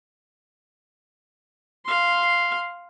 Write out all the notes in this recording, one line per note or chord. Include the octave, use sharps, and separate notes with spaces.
F5 C6